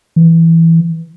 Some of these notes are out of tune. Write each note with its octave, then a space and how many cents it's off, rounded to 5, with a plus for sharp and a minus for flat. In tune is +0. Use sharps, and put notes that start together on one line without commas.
E3 +0